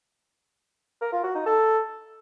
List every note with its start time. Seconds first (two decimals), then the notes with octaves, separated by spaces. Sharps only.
1.01 A#4
1.13 F4
1.24 F#4
1.35 D#4
1.46 A4